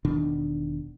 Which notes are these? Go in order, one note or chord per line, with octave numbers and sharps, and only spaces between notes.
E1 B2 D#3 D4